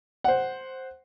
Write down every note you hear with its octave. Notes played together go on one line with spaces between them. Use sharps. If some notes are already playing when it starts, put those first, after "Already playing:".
C5 F#5